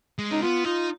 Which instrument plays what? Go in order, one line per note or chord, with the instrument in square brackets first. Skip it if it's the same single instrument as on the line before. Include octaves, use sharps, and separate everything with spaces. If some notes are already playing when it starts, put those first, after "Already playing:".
[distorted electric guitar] G#3
[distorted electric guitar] C#4 [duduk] D#4
[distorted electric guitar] B3 [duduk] F4
[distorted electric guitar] D#4 [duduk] F4